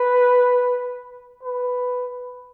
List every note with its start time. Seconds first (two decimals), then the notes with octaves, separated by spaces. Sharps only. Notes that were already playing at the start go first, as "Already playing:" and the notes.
Already playing: B4
1.43 B4